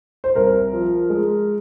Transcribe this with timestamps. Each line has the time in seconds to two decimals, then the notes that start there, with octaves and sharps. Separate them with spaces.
0.24 C5
0.35 C2 A#4
0.73 F3
1.10 G#3